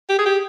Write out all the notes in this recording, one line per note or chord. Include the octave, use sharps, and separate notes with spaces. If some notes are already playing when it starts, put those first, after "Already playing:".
G4
G#4
G4